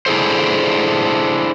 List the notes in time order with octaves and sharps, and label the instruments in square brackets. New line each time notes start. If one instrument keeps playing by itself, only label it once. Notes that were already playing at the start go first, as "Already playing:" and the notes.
[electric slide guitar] D4 E4 G#4 A4 C5